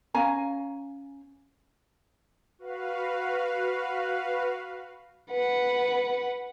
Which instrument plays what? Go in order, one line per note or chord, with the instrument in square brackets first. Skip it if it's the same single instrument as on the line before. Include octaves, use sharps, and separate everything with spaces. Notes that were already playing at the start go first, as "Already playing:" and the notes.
[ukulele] C#4 F5 G#5 A#5
[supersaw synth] F#4 B4 F5
[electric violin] B4 F#5